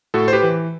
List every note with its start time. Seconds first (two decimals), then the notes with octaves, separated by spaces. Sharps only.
0.14 A2 F#4 A4
0.28 C5
0.33 G4 B4
0.43 E3